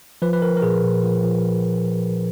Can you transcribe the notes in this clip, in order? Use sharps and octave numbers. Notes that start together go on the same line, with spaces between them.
F3 B4
B4
F3 A#4
A#4
A#2 G#4
A#2
F3
F3